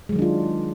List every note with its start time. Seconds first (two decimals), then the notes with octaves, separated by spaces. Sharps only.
0.09 G#3
0.12 F#3
0.16 D#3
0.19 D4
0.22 F4